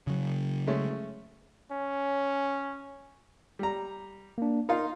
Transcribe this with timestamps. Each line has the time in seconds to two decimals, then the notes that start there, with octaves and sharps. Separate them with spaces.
0.07 C#3 F#3
0.67 G#3 A3 C#4
1.71 C#4
3.59 G3 A#5
4.38 A#3 D4
4.69 D#4 F4 A#4 F5